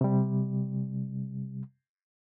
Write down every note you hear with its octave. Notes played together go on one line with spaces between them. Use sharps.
C3 G3